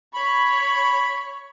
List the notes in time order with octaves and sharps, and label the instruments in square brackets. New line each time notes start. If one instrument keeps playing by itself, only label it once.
[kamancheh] C#5 [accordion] B5